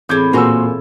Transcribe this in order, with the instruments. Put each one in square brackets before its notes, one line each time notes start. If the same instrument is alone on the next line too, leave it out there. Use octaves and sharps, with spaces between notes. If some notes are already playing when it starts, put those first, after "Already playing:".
[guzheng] E2 A2 E4 [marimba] C4 G#4 [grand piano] D6 G6 G#6
[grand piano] A#2 G#5 E6 [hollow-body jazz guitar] A#3 F#4 C5